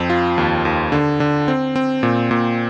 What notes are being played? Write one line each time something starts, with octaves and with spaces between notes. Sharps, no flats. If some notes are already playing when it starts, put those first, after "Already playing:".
Already playing: F2 C4
F4
D#2
D#2
D3
D3
C4
C4
A#2
A#2